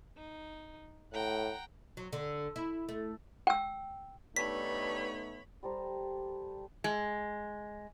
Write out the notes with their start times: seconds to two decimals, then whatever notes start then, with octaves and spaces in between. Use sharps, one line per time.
0.18 D#4
1.13 A2 F#5 G5 A#5
1.97 F#3
2.13 D3
2.56 E4
2.89 A3
3.47 G5 E6
4.36 G2 A3 B3 D#4 C#5 B5 B6
5.63 G3 A4 C5 A#5
6.84 G#3